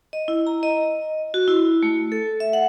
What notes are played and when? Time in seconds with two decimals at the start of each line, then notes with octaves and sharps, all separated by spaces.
0.13 D#5
0.28 E4
0.47 A#5
0.63 D#5
1.34 F#4
1.48 E4
1.83 A3
2.12 A4
2.40 E5
2.53 F#5